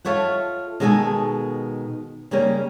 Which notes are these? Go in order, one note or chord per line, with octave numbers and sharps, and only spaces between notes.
F4 A4 C#5 E5 F#5
B2 D#3 G#3 A4 E5 G#5
C#3 G3 A#3 C#4